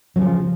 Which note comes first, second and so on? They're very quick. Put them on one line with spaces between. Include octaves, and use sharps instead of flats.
F#3 C#3 F3